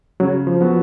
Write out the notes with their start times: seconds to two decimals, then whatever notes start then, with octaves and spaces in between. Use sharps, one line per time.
0.20 C#3 F#3
0.47 F3
0.61 F#3 B3